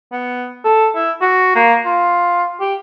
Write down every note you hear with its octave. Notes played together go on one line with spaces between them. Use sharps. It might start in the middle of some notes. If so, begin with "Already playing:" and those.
B3
A4
E4
F#4
A#3
F4
G4